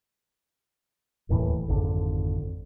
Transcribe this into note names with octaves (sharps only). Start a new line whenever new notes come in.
D1 D#2 A2 E3
G#1 F2 D3